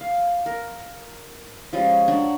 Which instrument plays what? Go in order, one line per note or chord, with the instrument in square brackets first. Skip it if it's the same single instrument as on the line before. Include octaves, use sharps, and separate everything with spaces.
[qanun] F5
A#4
F3 G3 G#3 C#4
F#3 D4 F#4